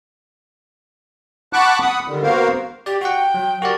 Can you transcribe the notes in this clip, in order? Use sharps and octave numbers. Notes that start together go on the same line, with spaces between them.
F#5 A5 B5 C#6 D6 F#6
F#5 B5 D#6
D3 D#3 G3
A#3 B3 F#4 A#4 C5 F5
G4 D5
F#4 F#5 G5
F#3
F#4 G4 A#4 D5